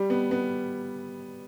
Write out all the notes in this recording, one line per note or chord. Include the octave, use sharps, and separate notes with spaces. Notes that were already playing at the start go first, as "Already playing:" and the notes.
Already playing: G3
B3
B3